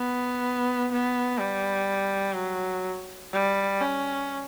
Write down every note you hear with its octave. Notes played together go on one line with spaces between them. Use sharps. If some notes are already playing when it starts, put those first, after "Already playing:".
Already playing: B3
B3
G3
F#3
G3
C#4